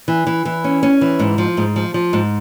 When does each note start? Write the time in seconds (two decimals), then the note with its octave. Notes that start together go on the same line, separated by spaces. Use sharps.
0.08 E3
0.27 E3
0.45 E3
0.64 C#4
0.83 C#4
1.01 E3
1.19 G#2
1.38 F3
1.57 G#2
1.76 F3
1.94 F3
2.13 G#2